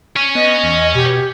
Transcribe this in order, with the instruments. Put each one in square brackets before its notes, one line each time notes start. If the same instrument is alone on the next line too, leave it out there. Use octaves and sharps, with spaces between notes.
[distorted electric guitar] C#5 G#5
[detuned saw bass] B3 [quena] D#5
[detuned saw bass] E2
[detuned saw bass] B2 [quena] G4